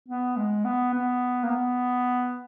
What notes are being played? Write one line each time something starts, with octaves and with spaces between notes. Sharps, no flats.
B3
G#3
B3
B3
A#3
B3